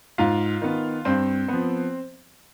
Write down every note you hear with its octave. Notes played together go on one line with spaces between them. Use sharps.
G#2 F4 F5
D#3 B3
G2 C4 C5
F3 B3